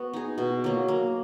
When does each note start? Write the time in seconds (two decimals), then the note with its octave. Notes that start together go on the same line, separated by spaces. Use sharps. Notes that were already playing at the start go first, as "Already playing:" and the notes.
Already playing: B3 F#4
0.14 D#4 G#4
0.38 B2
0.64 F#3 A#3
0.88 A#3